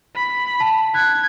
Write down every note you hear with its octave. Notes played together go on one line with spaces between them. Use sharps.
B5
A5
F#6 G#6